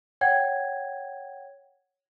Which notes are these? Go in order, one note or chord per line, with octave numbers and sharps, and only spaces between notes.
C#5 F#5 G5 G#6